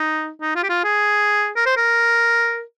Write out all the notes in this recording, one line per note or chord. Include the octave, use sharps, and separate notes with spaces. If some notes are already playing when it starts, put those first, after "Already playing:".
Already playing: D#4
D#4
F4
G4
F4
G#4
A#4
C5
A#4